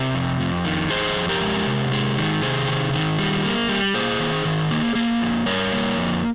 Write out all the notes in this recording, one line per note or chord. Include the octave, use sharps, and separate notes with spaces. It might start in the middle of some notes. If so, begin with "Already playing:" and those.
Already playing: C3 G4 A#4
F2
F2
D#3
F2 G#4 C5
F2
G4 A#4
G#3
C3
G#3
D#3
C3 G#4 C5
D#3
D#3
G3
A#3
G3
A#3 G#4 C5
D#3
D#3
A#3
A#3
F2
G3 A#4 C#5
A#3
F2